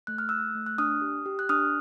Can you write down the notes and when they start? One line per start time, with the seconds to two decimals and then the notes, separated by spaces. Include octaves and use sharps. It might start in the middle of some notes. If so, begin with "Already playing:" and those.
0.07 A3 F#6
0.18 F6
0.29 A3 E6 F#6
0.55 A3
0.66 F#6
0.78 D4 D#6 F6
1.01 G4
1.26 G4
1.39 F#6
1.49 D4 D#6 F6